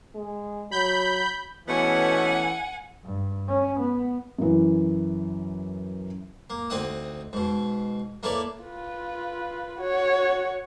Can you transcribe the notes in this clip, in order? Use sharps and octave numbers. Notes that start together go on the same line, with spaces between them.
G#3
F#3 B5 G6
B2 E3 A3 B3 C#4 F#5 G#5
G2
C#4
B3
F#2 E3
A#3
D2 C4 D#4 D#5 F#5 D#6
G#2 B2
A#3 E4 A4 B4 C#5 D5
F4 B4
F#4 C#5